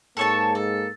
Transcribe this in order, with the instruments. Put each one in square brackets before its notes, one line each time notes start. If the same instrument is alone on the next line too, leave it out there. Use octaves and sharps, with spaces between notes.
[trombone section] G#2 G#3 A#3 [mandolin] A4 C#5 A5
[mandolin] A4